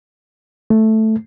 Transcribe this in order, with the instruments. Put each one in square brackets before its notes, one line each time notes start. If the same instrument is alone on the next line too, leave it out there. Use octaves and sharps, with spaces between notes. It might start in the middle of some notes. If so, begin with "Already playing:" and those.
[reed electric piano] A3